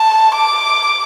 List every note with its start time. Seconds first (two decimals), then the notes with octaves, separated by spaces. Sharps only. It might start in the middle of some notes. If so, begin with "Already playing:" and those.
Already playing: A5
0.35 D6